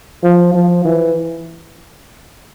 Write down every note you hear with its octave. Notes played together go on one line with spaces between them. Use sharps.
F3
F3
E3